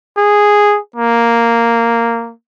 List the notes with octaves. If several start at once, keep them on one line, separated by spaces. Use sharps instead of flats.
G#4
A#3